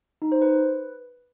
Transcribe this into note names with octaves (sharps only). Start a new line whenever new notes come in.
D#4
C5
B4